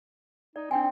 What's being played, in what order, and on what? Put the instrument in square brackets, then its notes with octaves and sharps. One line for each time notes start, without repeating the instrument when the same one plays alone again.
[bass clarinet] D#4 [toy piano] D5
[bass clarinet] C4 [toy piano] D4 G5 G#5